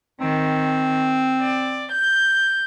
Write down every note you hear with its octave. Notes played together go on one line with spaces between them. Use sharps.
D#3 C4
D5
G6